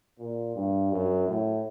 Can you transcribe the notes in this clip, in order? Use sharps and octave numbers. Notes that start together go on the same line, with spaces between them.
A#2
G2
F#2
A2